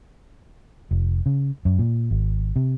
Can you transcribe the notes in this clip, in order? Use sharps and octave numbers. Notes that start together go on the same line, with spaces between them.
F1
C#3
F#2
A#2
G#1
C3